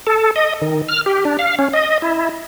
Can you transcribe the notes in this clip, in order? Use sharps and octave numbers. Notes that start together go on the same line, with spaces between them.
A4
D#5
D#3
F6
G4
D4
F5
C#4
D#5
E4